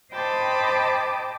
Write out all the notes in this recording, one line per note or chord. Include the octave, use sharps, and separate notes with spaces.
C5 D#5 G5 A5 B5 D6